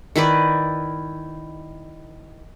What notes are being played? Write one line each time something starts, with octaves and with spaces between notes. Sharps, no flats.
D#3 E4 B4 D5